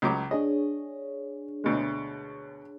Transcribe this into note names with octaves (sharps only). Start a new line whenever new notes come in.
C#2 F#3 D6
D4 G#4 C#5 D#5
D2 B2 G#3